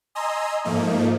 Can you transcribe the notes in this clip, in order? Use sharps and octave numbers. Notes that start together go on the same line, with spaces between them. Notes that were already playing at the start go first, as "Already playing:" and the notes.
D#5 G#5 A#5 C6 D#6 E6
G#2 F3 A3 A#3 D#4